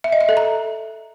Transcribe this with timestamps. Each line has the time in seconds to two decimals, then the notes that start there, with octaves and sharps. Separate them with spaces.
0.04 E5
0.12 D#5
0.21 E5
0.29 A4
0.37 A#5